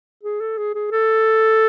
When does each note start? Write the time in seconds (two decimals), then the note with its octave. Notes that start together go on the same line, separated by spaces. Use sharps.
0.23 G#4
0.41 A4
0.58 G#4
0.75 G#4
0.91 A4